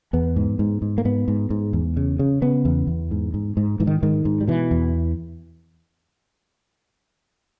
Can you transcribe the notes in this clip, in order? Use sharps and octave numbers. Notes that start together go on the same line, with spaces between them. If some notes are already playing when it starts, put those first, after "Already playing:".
E2 B3
G#2
G#2
G#2
A#3
G#2 B3
G#2
G#2
E2
C#3
C#3
C#3 B3
E2
E2
G#2
G#2
G#2
G#2 E3
D#3
G#2 D#3
G#2
G3
B2 E3
E2